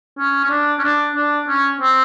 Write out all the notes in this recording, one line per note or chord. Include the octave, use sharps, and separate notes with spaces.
C#4
C#4
D4
C#4
D4
D4
C#4
C4